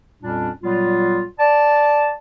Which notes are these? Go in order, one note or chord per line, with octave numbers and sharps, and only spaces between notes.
F2 A#2 G3 C#4 D4
A#2 F#3 G3 B3 F4
D5 A5